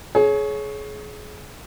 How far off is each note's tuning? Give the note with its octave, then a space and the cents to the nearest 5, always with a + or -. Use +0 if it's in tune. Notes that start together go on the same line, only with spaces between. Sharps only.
G#4 +30 C#5 +0